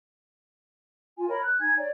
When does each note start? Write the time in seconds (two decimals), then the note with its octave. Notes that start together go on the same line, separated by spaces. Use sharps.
1.17 F4 G#5
1.28 A#4 C#5 D#5 B5
1.42 F#6
1.60 D#4 G#5 G#6
1.77 C#5 D5